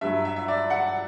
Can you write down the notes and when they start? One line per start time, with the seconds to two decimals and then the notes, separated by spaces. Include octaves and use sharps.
0.01 G2 F#3 E5
0.25 E5
0.36 E5
0.48 D5
0.70 F#5